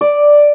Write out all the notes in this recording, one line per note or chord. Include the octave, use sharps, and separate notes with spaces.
D5